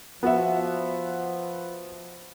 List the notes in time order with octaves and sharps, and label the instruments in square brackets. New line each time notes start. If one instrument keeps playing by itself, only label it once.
[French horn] F3 [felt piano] B3 F#4 E5